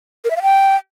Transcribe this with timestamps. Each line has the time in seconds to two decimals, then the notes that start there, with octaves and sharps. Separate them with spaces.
0.24 A#4
0.30 E5
0.36 F5
0.42 G5